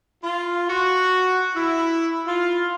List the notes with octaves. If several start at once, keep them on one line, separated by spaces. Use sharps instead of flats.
F4
F#4
E4
F4